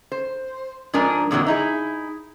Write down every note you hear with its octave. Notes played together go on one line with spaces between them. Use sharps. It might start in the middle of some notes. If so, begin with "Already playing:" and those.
C5
G#2 F3 D4 A#4 G#5
F2 A#2 D3 E3 F#3
D#4 E4 G#4